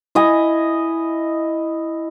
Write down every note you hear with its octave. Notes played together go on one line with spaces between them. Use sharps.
E4 D#5 G#5